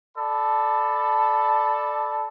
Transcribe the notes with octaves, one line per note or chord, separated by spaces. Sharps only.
A4 D5 A5 B5